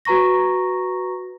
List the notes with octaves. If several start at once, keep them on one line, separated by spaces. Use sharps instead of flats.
F#4 B4 A#5 C#6 A#6